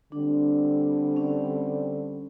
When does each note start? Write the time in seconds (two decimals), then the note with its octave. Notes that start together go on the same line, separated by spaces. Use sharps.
0.11 D3 G3 C4 D4
1.17 C#4